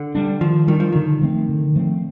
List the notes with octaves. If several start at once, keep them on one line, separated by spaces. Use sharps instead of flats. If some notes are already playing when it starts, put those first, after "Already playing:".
Already playing: D3
G3 D4
D#3 F3
D#3 G3 D4
F3
D3 D#3
F3 A3 C4
D3
F3 A3 C4